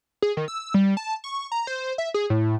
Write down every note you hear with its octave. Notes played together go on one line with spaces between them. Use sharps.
G#4
D#3
E6
G3
A5
C#6
A#5
C5
E5
G#4
A2